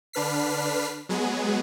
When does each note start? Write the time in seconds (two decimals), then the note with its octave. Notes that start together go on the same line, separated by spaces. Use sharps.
0.13 D3 D4 B4 F6 B6 C7
1.09 F#3 G#3 B3 G#4